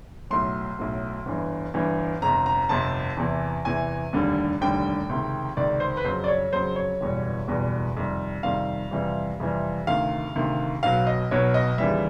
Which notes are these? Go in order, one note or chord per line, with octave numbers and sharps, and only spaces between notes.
B1 A2 F#3 C6
B1 A2 F#3
G1 G2 E3
G1 G2 E3
G1 F2 C3 A#5
A#5
G1 F2 C3 A5
E2 C3 E3
E2 C3 E3 G#5
F1 D#2 D3 G3
F1 D#2 D3 G3 G5
C#2 C3 D#3
C#2 C3 D#3 D5
C5
B4
F2 C#3 F#3 C5
D5
C#5
F2 C#3 F#3 C5
C#5
F#1 E2 B2 G3
F#1 E2 B2 G3
F2 C3 D#3 G3
F2 C3 D#3 G3 F5
F2 C3 E3 G3
F2 C3 E3 G3
D2 C3 D#3 F5
D2 C3 D#3
B1 B2 F#3 F5
D#5
B1 B2 F#3 C#5
D#5
D#2 C#3 E3 G3 E5